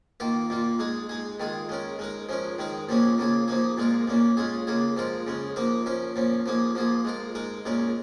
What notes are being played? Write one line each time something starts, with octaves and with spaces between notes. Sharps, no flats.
D#3 A#3 F4 A#4
A#2 A#3 F4
G#3 D#4 G#4
G#3 D#4 G#4
D#3 G#3 F4 G#4
G#3 C#4 A#4
G#3 D#4 A#4
F3 G#3 C#4 A#4
D#3 G#3 D#4 A#4
A#2 F3 A#3 C#4 G#4
C#3 A#3 F4 G#4
F3 A#3 D#4 G#4
A#2 G#3 F4 A#4
A#2 A#3 C#4
G#3 C#4 F4 G#4
C#3 A#3 F4 G#4
F3 G#3 F4 A#4
C#3 G#3 C#4
F3 A#3 D#4 A#4
F3 C#4 A#4
A#2 F3 C#4
F3 A#3 D#4 G#4
F3 A#3 F4 G#4
G#3 F4 A#4
G#3 D#4 A#4
A#2 G#3 C#4 A#4